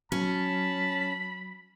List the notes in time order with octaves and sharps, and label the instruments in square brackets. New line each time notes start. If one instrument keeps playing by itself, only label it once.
[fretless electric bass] F#3 [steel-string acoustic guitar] C#4 [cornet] A5 [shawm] B5